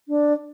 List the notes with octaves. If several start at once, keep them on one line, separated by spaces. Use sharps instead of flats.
D4